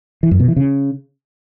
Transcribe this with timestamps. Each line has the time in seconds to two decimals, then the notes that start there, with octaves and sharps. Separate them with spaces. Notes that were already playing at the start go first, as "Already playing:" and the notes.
0.23 E3
0.31 F#2
0.40 B2
0.48 E3
0.56 C#3